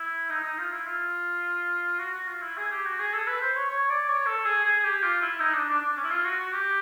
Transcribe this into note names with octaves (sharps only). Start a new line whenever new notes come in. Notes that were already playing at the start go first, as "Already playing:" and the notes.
Already playing: E4
D#4
D#4
F4
E4
F4
F#4
F#4
F4
E4
G#4
G4
F#4
G#4
A4
B4
C5
C#5
C#5
D5
C#5
A4
G#4
G#4
G#4
G4
F4
E4
D#4
D4
D4
D4
C#4
E4
F4
F#4
F#4
G4